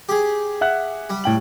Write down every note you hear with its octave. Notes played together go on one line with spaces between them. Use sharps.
G4 G#4
E5 F#5 F#6
G3
A2 G5 F#7